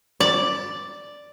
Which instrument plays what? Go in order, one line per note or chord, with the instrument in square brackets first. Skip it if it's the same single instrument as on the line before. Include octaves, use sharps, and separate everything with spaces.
[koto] D5